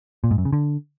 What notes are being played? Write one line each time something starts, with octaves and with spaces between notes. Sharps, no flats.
A#2
G#2
F#2
C#3
D3